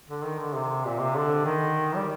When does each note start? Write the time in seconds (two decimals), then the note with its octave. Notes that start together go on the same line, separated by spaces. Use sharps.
0.09 D3
0.24 D#3
0.39 D3
0.54 C3
0.85 A#2
1.00 C3
1.16 D3
1.45 D#3
1.96 G3